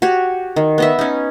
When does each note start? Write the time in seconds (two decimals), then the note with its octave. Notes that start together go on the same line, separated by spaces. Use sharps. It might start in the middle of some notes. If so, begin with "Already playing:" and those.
0.02 F#4 G4 C#5
0.56 D#3
0.78 B3 D#5 E5
0.99 C#4 D#4